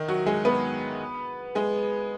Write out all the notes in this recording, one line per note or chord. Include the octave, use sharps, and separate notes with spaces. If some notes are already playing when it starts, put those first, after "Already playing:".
Already playing: D#3 D#4
F#3 F#4
G#3 G#4
B3 B4
G#3 G#4